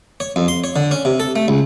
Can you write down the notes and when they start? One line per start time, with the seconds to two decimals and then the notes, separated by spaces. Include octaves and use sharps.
0.20 C#5
0.36 F2
0.48 C6
0.64 C#5
0.76 D3
0.91 C#4
1.05 C3
1.20 A4
1.36 A3
1.48 C#2